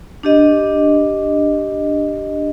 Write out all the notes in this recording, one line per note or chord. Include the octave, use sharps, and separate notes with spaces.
D4 G4 D#5